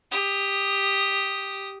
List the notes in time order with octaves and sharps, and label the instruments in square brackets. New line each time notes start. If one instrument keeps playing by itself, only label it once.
[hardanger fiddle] G4 D#6